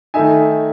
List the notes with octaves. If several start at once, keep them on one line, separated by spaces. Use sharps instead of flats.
D#3 A3 D#4 E5 G#5